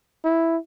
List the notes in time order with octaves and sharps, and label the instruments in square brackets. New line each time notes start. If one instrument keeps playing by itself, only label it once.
[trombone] E4